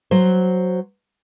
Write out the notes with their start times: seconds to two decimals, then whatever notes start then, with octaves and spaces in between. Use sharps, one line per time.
0.11 F#3 C5